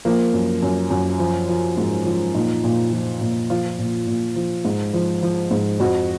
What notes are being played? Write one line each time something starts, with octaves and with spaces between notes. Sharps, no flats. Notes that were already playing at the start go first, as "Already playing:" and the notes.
F3 A#3
F#2
F#2
F#2
F3
F3
G#2
F3
A#2 D#4
A#2
F3
A#2
F3 F4
A#2
A#2
F3
G#2
F3
F3
G#2
F2 F#4